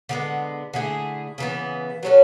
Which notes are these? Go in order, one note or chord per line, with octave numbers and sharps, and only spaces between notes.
D3 G#3 B3
D3 A3 E4 G#4
C#3 E3 B3
F#3 C#4 F#4 A4